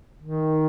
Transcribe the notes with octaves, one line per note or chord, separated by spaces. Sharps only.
D#3